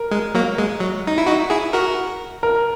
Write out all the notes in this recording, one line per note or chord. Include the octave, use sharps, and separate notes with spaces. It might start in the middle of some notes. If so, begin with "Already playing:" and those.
Already playing: A#4
G#3
F#3 A#3
G#3
F#3
D#4
E4
D#4 F#4
E4 G#4
F#4 A#4
A#4